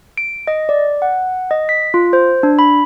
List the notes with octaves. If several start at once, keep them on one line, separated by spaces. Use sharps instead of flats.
D7
D#5
D5
F#5
D#5
B6
F4
C5
D4
B5